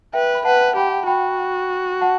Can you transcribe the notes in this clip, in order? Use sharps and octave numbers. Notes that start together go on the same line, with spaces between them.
B4 E5 G5
B5
B4 F#5 A5
G4 G5 B5
F#4 G5 B5
F#5 A5